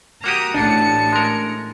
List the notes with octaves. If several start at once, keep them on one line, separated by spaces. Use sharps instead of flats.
A#3 F#4 G4 A#5 D#6
A1 A2 D4 A5 C#7
G#3 A#4